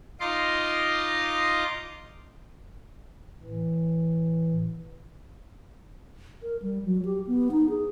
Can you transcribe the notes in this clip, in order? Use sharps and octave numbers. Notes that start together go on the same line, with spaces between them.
D#4 F4 D#5 C6 D6
A2 E3
A#4
G3
F#3
G4
B3
D#4
G#4